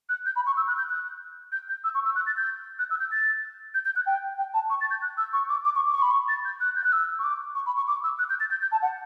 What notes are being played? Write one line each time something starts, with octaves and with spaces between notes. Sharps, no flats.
F#6
G6
B5
C#6
E6
F#6
G6
F#6
G6
G6
E6
C#6
E6
F#6
A6
G6
F#6
E6
G6
A6
G6
G6
F#6
G5
G5
A5
C#6
A6
G6
F#6
E6
C#6
D6
D6
C#6
D6
C#6
B5
C#6
A6
G6
F#6
G6
F#6
E6
C#6
D6
C#6
B5
C#6
D6
E6
F#6
G6
A6
G6
G6
A5
F#5